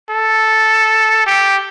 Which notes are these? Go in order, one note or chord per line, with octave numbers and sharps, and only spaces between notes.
A4
G4